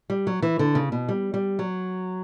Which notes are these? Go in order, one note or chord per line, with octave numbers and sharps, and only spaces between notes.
G3
F#3
E3
D3
C#3
B2
G3
G3
F#3